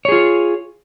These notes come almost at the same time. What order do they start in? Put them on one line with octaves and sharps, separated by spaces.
C#5 G#4 F4